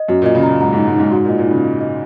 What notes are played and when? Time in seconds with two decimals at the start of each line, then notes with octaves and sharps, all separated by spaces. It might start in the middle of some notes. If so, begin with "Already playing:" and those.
Already playing: D#5
0.08 F#2 F#4
0.22 A#2 D#5
0.35 C#3
0.43 A#2 A#5
0.61 G#2 A#5
0.73 G#2 D#4
0.87 G#2
0.95 D#4
1.00 G#2
1.12 G#2 F#4
1.25 A#2 D#5
1.38 A#2
1.47 C#3 D#4
1.64 D#5
1.81 D#5